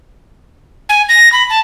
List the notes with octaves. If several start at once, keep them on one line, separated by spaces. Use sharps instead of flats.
G#5
A#6
B5
A5